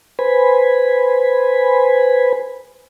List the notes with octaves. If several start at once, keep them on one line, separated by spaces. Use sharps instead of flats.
B4 C5 G#5 B5